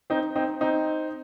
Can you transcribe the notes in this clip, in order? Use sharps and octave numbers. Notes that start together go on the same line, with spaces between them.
C4 D#4
C4 D#4
C4 D#4